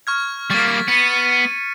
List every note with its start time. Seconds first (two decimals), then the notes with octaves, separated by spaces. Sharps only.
0.07 C#6 F6 G#6
0.50 G3 A#3 C#6 A6 B6
0.88 B3 C#7 D#7